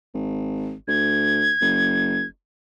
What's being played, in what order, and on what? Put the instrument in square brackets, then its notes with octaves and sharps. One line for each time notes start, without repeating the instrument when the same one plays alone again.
[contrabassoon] G#1
[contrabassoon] D2 [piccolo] G#6
[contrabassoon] F#1